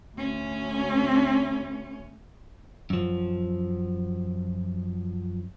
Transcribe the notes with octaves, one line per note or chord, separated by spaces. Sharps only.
D2 C#4
F#2 F3